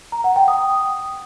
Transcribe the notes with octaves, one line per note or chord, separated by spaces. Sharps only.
A#5
F#5
G5
D#6